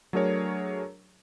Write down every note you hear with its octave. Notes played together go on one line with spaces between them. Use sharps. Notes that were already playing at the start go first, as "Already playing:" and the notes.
F#3 A3 D4 G#4 A#4 C#5